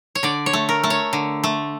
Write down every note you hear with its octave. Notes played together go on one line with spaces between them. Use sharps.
C#5
D3 D5
C#5
A3
A#4
A3
C#5
D3
A3